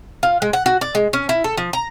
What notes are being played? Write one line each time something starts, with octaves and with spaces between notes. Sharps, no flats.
F4
G#3
F#5
F#4
D5
G#3
C#4
E4
A4
F3
A#5